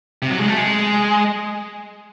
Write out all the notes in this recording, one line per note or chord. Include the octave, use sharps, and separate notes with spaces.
C3
F#3
G#3
A3
G#3